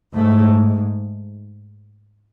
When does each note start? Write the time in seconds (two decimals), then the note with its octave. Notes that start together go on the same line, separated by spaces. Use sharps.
0.14 G#2 A3